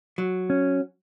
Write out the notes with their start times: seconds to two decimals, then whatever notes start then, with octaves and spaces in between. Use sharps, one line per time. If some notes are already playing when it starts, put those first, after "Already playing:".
0.18 F#3
0.50 C#4